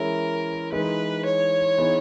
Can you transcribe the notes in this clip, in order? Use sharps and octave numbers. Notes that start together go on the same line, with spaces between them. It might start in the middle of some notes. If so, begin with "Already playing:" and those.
Already playing: E3 G#3 C#4 E4 A#4
E3 G#3 D#4 B4
C#5
E3 B3 D#4 G#4